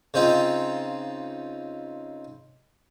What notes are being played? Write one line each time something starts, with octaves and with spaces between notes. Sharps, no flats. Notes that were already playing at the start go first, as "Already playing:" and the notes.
C#3 C4 D#4 F4